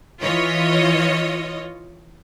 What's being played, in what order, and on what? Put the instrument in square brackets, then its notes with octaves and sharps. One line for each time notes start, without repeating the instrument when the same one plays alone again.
[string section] E3 F4 C#5 D#5